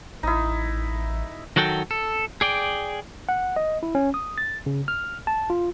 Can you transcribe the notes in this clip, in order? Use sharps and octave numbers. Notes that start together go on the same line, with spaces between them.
A1 D#4 E4
D#3 F#3 F#4 A4 G5
A4
G#4 D5 G5
F#5
D#5
E4
C#4
D#6
A6
C#3
F6
A5
F4